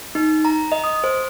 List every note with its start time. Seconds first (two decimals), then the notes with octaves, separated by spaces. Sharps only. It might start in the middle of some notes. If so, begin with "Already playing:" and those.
0.15 D#4
0.45 A#5
0.72 D#5
0.84 D#6
1.04 C5